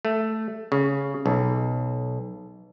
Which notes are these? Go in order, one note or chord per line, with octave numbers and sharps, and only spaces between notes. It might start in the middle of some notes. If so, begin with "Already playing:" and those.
A3
C#3
B1